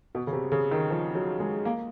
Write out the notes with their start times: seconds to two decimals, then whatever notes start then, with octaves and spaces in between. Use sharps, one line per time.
0.15 B2
0.27 C#3
0.33 C3
0.52 C#3
0.71 D#3
0.90 F3
1.15 F#3
1.40 G#3
1.65 A#3